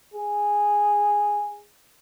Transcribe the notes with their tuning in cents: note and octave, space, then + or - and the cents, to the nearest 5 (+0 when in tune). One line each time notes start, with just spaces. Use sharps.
G#4 -10